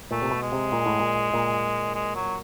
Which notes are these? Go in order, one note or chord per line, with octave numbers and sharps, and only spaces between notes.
A#2 A3
C3
B2
G#3
C3
A#2
A2
A#2
A#2
G#3
F#3